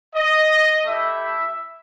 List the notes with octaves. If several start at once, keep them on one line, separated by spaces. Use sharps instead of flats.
D#5
A3 E4 G4 E5